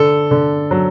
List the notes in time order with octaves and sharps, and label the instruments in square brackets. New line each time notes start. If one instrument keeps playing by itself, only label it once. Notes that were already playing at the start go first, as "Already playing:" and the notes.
Already playing: [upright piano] D3 A4
D3
F#3